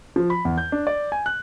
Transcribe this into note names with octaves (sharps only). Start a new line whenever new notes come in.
F3
B5
E2
G6
D4
D5
G#5
F#6